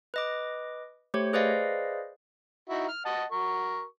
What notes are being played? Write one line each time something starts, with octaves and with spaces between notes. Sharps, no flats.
B4 D#5 D6
A3 G4 C5 C#5
G#4 B4 C5 D5 D#5 F5
D#4 E4 F#4
F6
D#5 F#5 A5
F#4 A#4 C#6